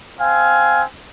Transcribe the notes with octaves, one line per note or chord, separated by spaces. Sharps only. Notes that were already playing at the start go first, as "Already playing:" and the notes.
C4 F5 G#5